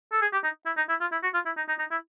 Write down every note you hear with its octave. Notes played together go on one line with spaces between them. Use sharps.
A4
G#4
G4
D#4
E4
D#4
E4
F4
E4
F#4
F4
E4
D#4
D#4
D#4
E4